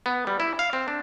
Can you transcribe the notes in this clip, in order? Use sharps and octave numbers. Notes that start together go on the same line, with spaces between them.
B3
G3
E4
F5
C4
D4